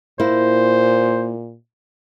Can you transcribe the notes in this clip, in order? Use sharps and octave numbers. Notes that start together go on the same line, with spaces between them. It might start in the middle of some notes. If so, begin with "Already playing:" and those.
A#2 A#3 E4 C5